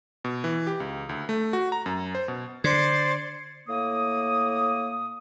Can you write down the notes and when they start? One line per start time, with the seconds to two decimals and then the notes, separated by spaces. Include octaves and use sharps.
0.24 B2
0.44 E3
0.67 G4
0.80 C#2
1.09 D2
1.29 A3
1.53 F#4
1.72 A#5
1.86 F#2
2.15 C5
2.28 B2
2.64 D3 C5 D5 G#6 C7 C#7
3.68 A2 A#3 D#6